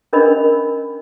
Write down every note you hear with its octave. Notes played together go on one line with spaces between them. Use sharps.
C#4 D4 A#4 D#5 B5